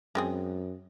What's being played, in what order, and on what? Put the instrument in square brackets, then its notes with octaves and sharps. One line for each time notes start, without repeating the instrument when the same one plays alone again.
[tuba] F#2 [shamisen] G#3 C4 G#4